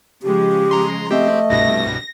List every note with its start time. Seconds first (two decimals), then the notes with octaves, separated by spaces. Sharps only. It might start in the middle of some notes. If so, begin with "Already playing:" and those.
0.23 C#3 F3 G#3 G4
0.71 A#5 C6
1.11 A3 C4 G4 D#5
1.50 C2 G2 B2 A#6